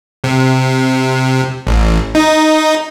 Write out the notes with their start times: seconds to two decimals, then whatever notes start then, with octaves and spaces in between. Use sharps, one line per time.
0.24 C3
1.67 A1
2.15 D#4